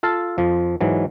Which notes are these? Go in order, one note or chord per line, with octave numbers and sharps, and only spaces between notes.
F4 A4 F5 A5
F2 F3
G#2 E3 F#3